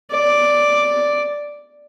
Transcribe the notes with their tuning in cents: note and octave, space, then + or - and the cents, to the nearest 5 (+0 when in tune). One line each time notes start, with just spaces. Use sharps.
D5 +0